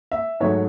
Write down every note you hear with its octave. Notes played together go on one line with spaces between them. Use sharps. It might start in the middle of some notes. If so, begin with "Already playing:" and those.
E5
G#2 F#3 A3 C#5